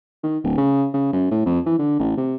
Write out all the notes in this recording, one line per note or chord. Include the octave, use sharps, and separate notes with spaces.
D#3
D1
C#3
C#3
F#2
A2
F2
E3
D3
A1
C3